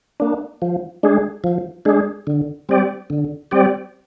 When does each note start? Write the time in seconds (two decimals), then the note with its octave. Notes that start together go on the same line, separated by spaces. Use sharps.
0.20 A#3 D4
0.62 F3
1.03 G#3 D4 G#4
1.44 F3
1.85 G#3 D4 G#4
2.27 D3
2.69 G3 C4 G4 D5
3.10 D3
3.51 G3 C4 G4 D5